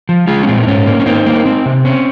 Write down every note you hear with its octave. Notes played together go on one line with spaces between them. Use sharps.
F3
G#3 F4 G#4
C#4
A#2 C4
D#4
G#2 C#4
A#3
C#4
A#3 C4 D#4
A#3
C4
C3
C4 C#4